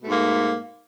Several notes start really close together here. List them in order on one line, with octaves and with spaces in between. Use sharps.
B2 A3 G#2 A#3